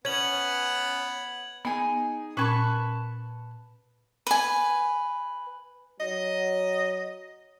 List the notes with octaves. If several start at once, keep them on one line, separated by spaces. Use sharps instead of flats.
B3 C#4 G#6 F#7
B3 D#4 G#4 G#5
A#2 C#4 B4 A5 C#6 G#6
B4 G#5
F#3 D#5